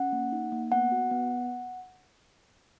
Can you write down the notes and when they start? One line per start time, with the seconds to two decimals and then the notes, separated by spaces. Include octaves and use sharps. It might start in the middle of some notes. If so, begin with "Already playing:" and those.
Already playing: C#4 F#5
0.12 A#3
0.32 D#4
0.52 A#3
0.72 B3 F#5
0.92 F#4
1.11 B3